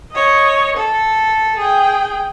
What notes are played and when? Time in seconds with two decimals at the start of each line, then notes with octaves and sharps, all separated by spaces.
0.12 C#5 D#5
0.77 A4
1.58 G#4 G5